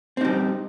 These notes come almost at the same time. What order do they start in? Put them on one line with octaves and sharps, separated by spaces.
C4 D#4 G3